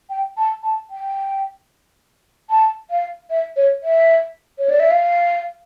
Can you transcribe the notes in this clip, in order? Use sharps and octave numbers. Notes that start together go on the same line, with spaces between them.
G5
A5
A5
G5
A5
F5
E5
C#5
E5
C#5
D5
E5
F5